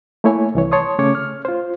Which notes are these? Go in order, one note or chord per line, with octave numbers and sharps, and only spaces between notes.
A3 A#3 E4 C#5 G#5
C2 E3 C#5
C#5 A5 C6 D#6
C#3 A3 C#4 C#5 D6
F6
F4 C5